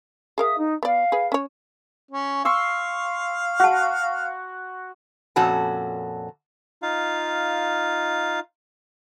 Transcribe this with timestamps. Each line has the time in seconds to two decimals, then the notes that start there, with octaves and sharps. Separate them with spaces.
0.38 G#4 A#4 E5 F5 D#6
0.56 D#4
0.83 B3 D5 F5
1.12 G#4 B4
1.32 C#4 C#5
2.11 C#4
2.45 F5 C6 C#6 E6
3.60 F#4 F#5 A5
5.36 F2 A#2 C#4 F#4 A4 A5
6.82 D#4 F4 F5